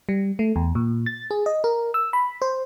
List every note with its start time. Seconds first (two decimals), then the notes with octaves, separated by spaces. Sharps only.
0.09 G3
0.39 A3
0.56 E2
0.75 A#2
1.06 A6
1.31 G#4
1.46 D#5
1.64 A#4
1.94 E6
2.13 B5
2.42 C5